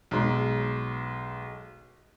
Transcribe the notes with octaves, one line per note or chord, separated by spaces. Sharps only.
B1 G#3